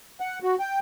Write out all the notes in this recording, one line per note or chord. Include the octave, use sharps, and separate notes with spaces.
F#5
F#4
G5